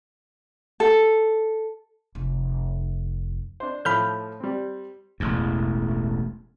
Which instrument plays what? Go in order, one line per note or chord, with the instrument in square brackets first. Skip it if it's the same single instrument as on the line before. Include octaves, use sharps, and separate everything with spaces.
[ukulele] A4
[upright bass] F1
[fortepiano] D4 C5
[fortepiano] A2 F3 [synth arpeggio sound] B5 F6 G6
[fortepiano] G3 C4
[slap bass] E1 A1 E2